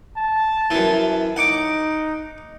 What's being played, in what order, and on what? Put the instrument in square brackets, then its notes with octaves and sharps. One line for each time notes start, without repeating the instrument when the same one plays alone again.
[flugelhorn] A5
[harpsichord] F#2 E3
[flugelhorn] D#4 [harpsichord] F#5 D6